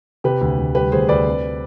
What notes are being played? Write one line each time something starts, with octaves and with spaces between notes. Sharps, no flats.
C3 G4 B4
D2
D2
G3 G4 B4
D2 G#4 C5
D2 B4 D5
C4